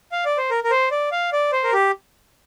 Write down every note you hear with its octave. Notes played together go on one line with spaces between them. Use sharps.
F5
D5
C5
A#4
A#4
C5
D5
F5
D5
C5
A#4
G4